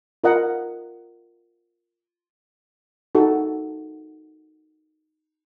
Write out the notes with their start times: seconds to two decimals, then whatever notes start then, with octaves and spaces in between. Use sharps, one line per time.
0.24 F4 A#4 D#5 F#5 A#5
3.15 D#4 F#4 A4